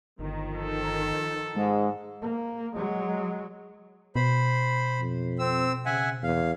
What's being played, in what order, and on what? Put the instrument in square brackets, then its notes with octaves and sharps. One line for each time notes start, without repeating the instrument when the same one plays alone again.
[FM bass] G1 [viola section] D#3 F3
[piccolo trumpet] A4
[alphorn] G#2 [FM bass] G#3
[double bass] A#3
F#3 G#3
[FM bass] B2 [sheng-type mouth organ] C5 B5
[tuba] F2
[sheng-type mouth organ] C4 E6
[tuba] C#3 [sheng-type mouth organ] E5 F#5 G#5
[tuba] E2 [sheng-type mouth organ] F5